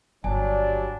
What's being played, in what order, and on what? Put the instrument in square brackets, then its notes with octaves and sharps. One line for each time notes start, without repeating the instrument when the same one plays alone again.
[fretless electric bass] G1 [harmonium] F#3 G3 [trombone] D4 [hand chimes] G#5